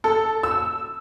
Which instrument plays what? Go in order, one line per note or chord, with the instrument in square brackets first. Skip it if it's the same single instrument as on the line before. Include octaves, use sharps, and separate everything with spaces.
[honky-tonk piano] A4
E6